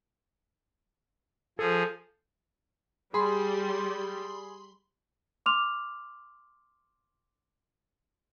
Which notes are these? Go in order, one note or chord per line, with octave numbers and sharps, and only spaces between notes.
F3 G#4 A4
G3 G#4 B5 C6
C6 D6 F6 F7